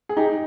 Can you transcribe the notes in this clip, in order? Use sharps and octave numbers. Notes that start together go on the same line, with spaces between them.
G#4
D#4 G4